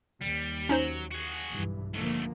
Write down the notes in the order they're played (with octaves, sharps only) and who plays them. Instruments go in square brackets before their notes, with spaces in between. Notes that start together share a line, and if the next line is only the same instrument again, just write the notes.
[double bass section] D#2 [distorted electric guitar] G3
[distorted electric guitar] F#3 [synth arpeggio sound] C#4 D#4 C5
[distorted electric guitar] F#4 G#4
[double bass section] B1 G2 E3
[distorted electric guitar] G#2 A3 [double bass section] D3 F3 A#3